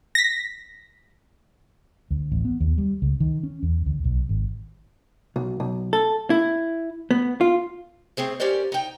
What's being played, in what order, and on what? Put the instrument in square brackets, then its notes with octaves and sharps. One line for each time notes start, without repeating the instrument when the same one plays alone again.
[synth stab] A#6 B6
[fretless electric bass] D2
A1
B3
D#2
G3
C#2
D#3
C#4
E2
D2
B1
G#1
[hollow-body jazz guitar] B1
B1
A4
E4
B3
F4
[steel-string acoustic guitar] A3 C4 G#4 C5
A#3 C#4 G4 A#4 C5 D5
D#4 G5 A#5